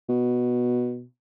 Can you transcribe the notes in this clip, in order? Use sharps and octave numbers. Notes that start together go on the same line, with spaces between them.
B2